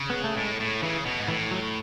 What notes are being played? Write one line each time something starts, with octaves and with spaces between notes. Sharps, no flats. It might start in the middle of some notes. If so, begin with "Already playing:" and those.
Already playing: C#3
B3
A3
A2 G#3
A2
C#3 E3
B2
G#2
A2 E3
F#3